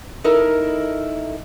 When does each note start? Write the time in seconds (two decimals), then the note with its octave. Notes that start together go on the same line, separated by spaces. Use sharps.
0.24 D#4 E4 A4 A#4